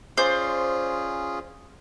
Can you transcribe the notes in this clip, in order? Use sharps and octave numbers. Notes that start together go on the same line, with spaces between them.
C#4 F4 G#4 C5 D5